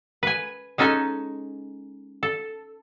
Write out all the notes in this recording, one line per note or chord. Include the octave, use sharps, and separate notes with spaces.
B4 G#5
G#3 C#4 D#4 A4 G#5
A4